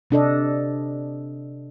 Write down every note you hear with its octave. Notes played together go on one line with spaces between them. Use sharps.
C3 D4 A4 D#5